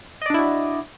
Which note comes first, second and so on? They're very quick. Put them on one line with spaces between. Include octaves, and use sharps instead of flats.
D#5 D5 D4 E4 F#4